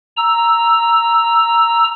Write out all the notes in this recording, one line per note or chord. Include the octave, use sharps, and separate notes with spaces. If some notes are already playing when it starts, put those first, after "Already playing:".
A#5 E6